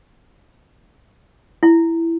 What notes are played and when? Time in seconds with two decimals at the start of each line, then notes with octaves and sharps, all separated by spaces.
1.63 E4